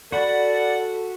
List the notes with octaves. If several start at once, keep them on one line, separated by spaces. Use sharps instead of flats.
F#4 A4 D5 F#5 B5